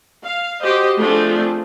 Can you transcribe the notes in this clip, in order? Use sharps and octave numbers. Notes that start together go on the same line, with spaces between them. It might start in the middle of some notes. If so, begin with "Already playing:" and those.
F5
F#4 G4 C5 D#5
F3 A3 C4 D4 F4 G#4